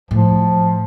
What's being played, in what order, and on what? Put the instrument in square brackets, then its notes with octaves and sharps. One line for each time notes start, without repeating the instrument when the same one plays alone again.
[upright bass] A2 [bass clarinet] F3